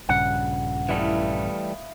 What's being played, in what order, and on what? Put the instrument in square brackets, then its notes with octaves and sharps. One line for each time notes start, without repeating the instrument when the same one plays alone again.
[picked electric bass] A#1 G2 C#3 [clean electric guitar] F#5
[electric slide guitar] E3 G3 A3 [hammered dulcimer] E4 D#5 F5